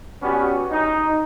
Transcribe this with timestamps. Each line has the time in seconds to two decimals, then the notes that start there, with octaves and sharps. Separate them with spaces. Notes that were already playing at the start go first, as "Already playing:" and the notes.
0.23 G3 B3 C#4 F#4
0.71 D#4